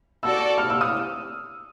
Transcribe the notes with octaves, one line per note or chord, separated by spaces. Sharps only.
F#4 A4 D5 E6
F6
E6
D#6